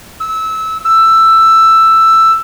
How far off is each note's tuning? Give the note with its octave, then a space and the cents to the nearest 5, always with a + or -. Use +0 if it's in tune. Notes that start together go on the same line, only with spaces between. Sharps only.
E6 -25
E6 +10